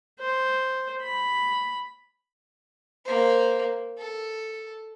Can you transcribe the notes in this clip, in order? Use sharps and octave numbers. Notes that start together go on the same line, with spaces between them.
C5
B5
A#3 C5
A4